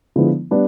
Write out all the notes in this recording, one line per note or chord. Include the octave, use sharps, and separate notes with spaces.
D3 F3 G#3 B3 E4
G3 B3 D4